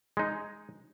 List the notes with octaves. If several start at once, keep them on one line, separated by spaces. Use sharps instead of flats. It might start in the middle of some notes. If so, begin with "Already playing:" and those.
G#3 D#4